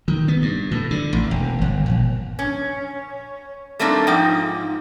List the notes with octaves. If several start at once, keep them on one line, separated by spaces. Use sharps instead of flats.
D#3
B3
G2
A2
D3
A1
E1
G1
A#1
C#4
G3 A3 A#3 C4 D4 D#4
G#2 F3 D#4 G5